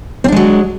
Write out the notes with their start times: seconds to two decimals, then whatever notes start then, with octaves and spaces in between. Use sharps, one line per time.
0.24 C4
0.28 D4
0.32 G#3
0.36 F#3